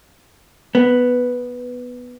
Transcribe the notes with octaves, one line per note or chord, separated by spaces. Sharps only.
B3